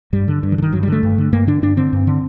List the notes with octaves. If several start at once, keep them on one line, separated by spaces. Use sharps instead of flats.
G2 G3
D3
G2
D#3
D3
D#3
G2 F#3
G3
D3 A3
G2
D3
G2 A#3
D3 D4
G2 D4
D3 C4
G2
D3